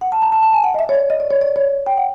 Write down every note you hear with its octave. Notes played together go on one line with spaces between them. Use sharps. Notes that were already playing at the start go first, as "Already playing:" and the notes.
F#5
A5
A#5
A5
A5
G#5
F#5
D#5
E5
C#5
D5
D#5
D5
C#5
D5
C#5
G5
F#5